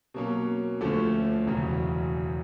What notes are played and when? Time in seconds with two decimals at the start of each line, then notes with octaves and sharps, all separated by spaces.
0.14 B2 F#3 A#3 C#4
0.81 D2 D3 F3 A3 C#4
1.46 E1 E2 C#3 F#3